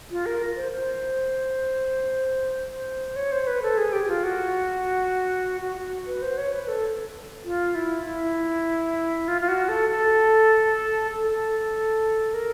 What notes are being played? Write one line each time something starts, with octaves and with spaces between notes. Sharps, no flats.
F4
A#4
C5
C5
C#5
C5
B4
A4
G#4
G4
F4
F#4
F#4
F#4
B4
C5
C#5
B4
A4
F4
E4
E4
F4
F4
F#4
A4
A4
A4
A#4